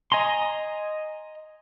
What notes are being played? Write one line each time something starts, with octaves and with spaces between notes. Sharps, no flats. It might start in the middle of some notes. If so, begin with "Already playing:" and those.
D#5 G#5 A#5 C6